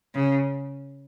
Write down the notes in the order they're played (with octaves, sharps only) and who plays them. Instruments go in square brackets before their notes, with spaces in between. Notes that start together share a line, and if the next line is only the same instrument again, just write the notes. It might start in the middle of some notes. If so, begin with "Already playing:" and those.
[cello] C#3